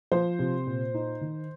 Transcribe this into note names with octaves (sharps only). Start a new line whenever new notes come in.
F3 C5
C3
A#2
D#4
D#3